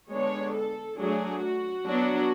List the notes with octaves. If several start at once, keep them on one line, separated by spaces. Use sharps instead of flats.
D3 G#3 B3 D4 C#5
A4
F#3 A3 D4 G#4
F#4
F#3 B3 D4